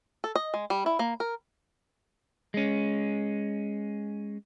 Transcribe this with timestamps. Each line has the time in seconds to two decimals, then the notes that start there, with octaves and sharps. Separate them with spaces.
0.24 A4
0.35 D#5
0.54 G#3
0.70 G3
0.86 E4
0.99 A#3
1.20 A#4
2.54 G#3 C#4